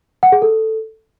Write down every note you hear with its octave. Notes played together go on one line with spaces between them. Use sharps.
F#5
G#4
A4